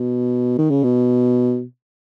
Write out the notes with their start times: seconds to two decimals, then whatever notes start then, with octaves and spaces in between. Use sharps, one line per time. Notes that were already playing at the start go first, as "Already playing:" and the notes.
Already playing: B2
0.58 D#3
0.70 C#3
0.83 B2